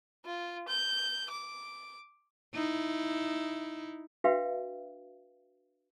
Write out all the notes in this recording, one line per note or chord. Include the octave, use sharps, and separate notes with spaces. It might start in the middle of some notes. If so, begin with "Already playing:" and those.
F4
G6
D6
D#4 E4
D4 F#4 B4 E5 F5 G5